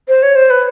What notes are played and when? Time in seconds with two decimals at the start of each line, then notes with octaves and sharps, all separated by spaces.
0.08 C5
0.23 C#5
0.36 C5
0.50 B4